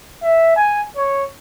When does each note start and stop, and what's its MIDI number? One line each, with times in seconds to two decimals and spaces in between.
0.23 0.51 76
0.56 0.82 80
0.97 1.25 73